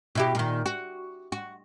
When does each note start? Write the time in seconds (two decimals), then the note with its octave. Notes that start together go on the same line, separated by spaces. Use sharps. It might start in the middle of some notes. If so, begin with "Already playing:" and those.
0.15 B2 E4 G4
0.35 A#2 D#3
0.66 F#4
1.32 F#4